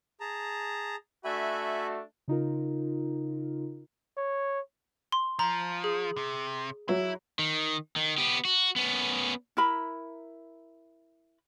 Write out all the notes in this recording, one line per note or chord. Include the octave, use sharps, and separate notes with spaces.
G#4 A5 A#5
A3 D4 F#4 E5 G#5 B5
C#3 D#4 F4 A#4
C#5
C6
F3 A#5
G#4
C3
F#3 E4
D#3
D#3
B3 G4
F#4
B3 C#4
E4 A#4 B5